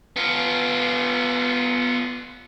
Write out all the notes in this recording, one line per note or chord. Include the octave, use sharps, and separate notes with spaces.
B3 F4